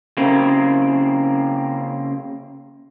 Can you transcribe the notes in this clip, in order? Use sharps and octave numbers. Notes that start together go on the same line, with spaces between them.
C#3 A#3 C4